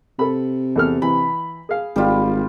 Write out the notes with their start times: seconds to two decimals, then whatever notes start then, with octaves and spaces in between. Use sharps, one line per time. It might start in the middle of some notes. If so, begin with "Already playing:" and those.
0.19 C3 A4 B5
0.76 E2 A4 F6
1.02 E3 B5
1.69 G#4 F5
1.96 G#1 G3 F4